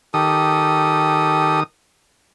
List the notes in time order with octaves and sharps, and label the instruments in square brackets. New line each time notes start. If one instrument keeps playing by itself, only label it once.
[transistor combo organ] D#3 D#6 [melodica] G4 A4